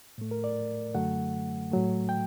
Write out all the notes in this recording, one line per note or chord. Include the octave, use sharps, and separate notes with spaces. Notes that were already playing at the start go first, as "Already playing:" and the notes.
A2 A3
A#4
D5
F#2 D3 F#3 A3 F#5
A2 F#3 A3
G5